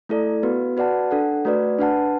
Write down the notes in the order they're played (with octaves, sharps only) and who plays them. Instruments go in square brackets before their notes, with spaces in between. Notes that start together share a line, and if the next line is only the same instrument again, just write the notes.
[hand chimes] A3 E4 A4 D5
B3 F#4 B4
F#4 B4 D5 F#5 A5
D4 A4 F#5
A3 F#4 B4 D5
D4 B4 F#5 A5